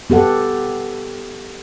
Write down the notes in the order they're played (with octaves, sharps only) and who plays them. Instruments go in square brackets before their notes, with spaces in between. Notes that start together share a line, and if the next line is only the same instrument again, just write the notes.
[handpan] B3 G4 A4 F#5